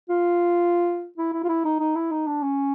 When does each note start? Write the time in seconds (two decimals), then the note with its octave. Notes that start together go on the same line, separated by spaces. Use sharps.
0.09 F4
1.18 E4
1.34 E4
1.44 F4
1.49 E4
1.65 D#4
1.80 D#4
1.96 E4
2.11 D#4
2.27 D4
2.42 C#4